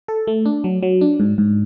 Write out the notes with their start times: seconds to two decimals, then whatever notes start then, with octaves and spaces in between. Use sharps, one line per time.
0.08 A4
0.27 A3
0.45 D4
0.64 F#3
0.83 F#3
1.01 D4
1.20 G#2
1.38 G#2